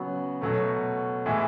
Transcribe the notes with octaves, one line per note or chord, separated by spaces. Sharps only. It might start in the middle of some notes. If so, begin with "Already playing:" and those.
Already playing: C#3 F#3 B3 F#4
B2 F#3 A3
A2 E3 G#3